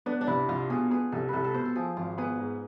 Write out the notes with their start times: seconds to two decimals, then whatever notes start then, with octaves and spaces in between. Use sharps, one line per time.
0.06 B3 D4
0.21 D4
0.27 C2 E4
0.49 C2 F4
0.70 B2 G#4
0.91 B3 G#4
1.12 C2 A4
1.29 C2 A4 B4
1.44 A4
1.54 B2 C5
1.65 A4
1.76 F3 G#4
1.97 G#1 F4
2.18 B3 G#4
2.39 G#2